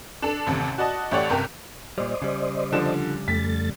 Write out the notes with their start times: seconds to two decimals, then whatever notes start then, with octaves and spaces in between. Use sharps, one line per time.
0.22 D4 A4
0.47 A1 D#2 C3
0.78 F#4 D5 D#5 A5
1.11 A1 A3 G4 C#5 D5 F#5
1.29 G1 C3 A#4 G5
1.98 A#2 G3 C5 D5 D#5
2.22 C#3 G3
2.72 D3 F3 E7
3.28 F2 A3 A6 B6